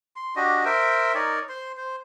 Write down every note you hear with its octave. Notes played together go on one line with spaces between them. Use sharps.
C6
D4 F#4 G4 D#5
A#4 C5 E5 G5
D#4 A#4 C#5 D5
C5 C6
C5